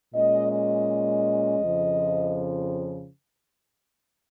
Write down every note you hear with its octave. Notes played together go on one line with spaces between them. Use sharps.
A#2 G#3 C#4 D#5
D#5
F2 C#3 F3